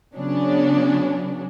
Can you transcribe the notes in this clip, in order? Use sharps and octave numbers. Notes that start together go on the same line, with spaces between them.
C#3 F#3 B3 C#4 D4